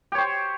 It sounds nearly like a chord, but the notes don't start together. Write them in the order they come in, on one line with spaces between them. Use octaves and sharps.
G4 C#5 C5